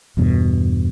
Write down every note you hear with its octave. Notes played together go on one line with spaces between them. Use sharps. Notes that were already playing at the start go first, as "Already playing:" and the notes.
E2 G2 B2